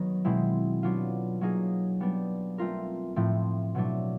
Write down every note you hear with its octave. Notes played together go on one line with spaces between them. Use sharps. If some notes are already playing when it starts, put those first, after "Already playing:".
Already playing: D#3 F#3 B3 D#4
B2 G#3 C4 E4
F#3 B3 D4 F4
F#3 A#3 D#4 G#4
G3 B3 D4
A3 C4 F4 A#4
A2 F3 A3 C4
B2 F#3 A3 D4